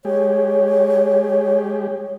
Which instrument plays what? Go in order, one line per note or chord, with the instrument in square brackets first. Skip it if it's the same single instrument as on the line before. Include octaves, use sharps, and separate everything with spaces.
[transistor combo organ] G#3 G4 [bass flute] C#5